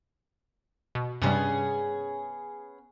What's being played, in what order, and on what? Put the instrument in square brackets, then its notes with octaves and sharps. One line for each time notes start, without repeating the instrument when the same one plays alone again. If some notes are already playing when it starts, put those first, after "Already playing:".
[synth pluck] B2
[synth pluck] G2 C3 G3 [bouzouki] B3 C#4 G#4